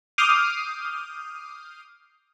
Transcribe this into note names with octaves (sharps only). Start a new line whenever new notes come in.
D6 D#6 F6 G6 C7 D#7